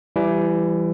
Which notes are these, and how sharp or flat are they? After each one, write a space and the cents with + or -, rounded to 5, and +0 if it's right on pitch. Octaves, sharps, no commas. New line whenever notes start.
E3 +25 G3 +0